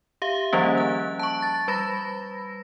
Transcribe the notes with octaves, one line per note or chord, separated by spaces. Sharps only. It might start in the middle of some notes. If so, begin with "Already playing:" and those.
G4 E5 F5
D#3 F3 G3 A#3 C#4
F#6
A5 C#6
A6
G3 B4 B5 A#6